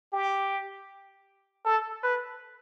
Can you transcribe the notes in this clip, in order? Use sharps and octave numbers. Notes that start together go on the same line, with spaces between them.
G4
A4
B4